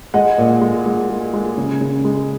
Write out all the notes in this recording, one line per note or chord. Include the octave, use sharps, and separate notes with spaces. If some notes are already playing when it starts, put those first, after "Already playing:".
G#3 D#5 F#5
A#2
G#3
G#3
G#3
G#3
C#3
C#3
G#3